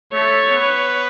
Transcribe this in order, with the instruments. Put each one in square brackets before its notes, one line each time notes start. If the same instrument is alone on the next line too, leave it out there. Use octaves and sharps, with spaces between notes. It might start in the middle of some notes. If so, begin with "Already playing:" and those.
[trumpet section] A3 A4 [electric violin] C#5
[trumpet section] B3 B4